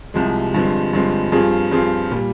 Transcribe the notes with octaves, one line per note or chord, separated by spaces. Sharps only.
C2 C3 F3 G#3
G2 D3 F3 G#3 C4
G2 D3 F3 G#3 C4
G2 F3 C4 F4 G#4
G2 F3 C4 F4 G#4
A#2 G3